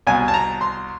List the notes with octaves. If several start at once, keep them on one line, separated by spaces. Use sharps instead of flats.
C2 B2 G#5
A5
A#5
C6